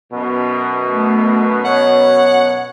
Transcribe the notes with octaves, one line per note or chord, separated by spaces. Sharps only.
F#2 B2
A3
C#5 F#5